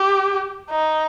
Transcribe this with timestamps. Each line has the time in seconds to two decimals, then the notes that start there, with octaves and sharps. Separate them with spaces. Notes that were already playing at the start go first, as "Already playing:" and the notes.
Already playing: G4
0.70 D#4